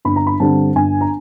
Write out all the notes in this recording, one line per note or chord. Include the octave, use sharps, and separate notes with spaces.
G1 B5
A#5
B5
G2 D3 G3 C4 A5
G1 G#5
A#5